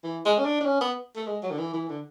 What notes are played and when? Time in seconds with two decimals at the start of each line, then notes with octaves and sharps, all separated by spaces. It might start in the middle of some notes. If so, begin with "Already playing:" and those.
0.04 E3
0.25 G#3
0.39 C#4
0.45 D4
0.61 D4
0.66 C#4
0.81 B3
1.16 A3
1.27 G#3
1.43 F#3
1.51 D3
1.59 E3
1.74 E3
1.89 D3